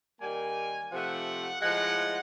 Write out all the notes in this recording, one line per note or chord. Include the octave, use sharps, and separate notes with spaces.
D#3 G3 A#3 G#5
C3 F3 A3 F#5
A2 F3 G#3 F#5